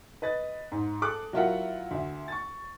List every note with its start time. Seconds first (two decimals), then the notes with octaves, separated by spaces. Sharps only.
0.22 B4 D#5 A6
0.72 G#2
1.02 G#4 A4 D6 F#6
1.33 F#3 E4 F4 A#4 E5 F#5
1.91 D2 E5
2.28 C#6 A6